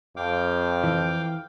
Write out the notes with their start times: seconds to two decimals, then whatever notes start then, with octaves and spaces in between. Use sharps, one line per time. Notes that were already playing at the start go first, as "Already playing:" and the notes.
0.17 F2 F5 G5 D6
0.84 E3